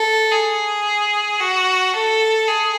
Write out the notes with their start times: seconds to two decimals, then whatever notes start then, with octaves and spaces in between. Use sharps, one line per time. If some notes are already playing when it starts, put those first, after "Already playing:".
Already playing: A4
0.31 G#4
1.40 F#4
1.94 A4
2.47 G#4